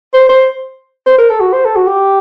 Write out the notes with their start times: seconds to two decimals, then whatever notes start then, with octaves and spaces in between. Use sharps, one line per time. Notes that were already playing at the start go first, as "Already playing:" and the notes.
0.14 C5
0.29 C5
1.06 C5
1.18 A#4
1.30 A4
1.41 F#4
1.53 C5
1.65 A4
1.76 F#4
1.87 G4